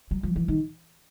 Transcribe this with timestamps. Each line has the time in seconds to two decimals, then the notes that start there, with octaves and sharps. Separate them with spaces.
0.11 F#3
0.23 F3
0.36 E3
0.48 D#3